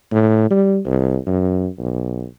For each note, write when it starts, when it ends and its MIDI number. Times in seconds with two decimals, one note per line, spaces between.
0.12 0.49 45
0.51 0.79 55
0.86 1.17 36
1.27 1.68 42
1.78 2.26 35